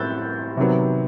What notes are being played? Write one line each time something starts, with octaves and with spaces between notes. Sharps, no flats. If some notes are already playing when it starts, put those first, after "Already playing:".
Already playing: A2 E6 F#6 G6 A6
C3 D#3 F#3 B3